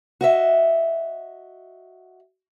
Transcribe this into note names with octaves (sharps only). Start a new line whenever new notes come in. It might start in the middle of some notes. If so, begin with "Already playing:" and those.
F#4 D#5 E5